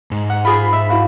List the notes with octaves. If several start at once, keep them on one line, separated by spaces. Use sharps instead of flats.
G#2
F#5
F4 G#4 B5 D#6
E5
E4 F#4 F5